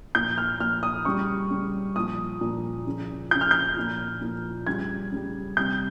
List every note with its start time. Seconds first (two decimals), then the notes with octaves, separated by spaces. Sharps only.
0.15 A#2 F3 G6
0.38 F6
0.60 A#2 F3 F6
0.83 D#6
1.05 C#3 G3 C#6
1.50 C#3 G3
1.96 A#2 F3 D#6
2.41 A#2 F3
2.86 C#3 F3
3.31 C#3 F3 G6
3.41 F6
3.51 G6
3.76 A#2 F3
4.21 A#2 F3
4.67 C#3 G3 G#6
5.12 C#3 G3
5.57 C3 G3 G6